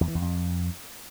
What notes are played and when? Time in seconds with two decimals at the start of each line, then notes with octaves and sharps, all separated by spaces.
0.01 E2
0.08 E3
0.15 E2
0.22 F2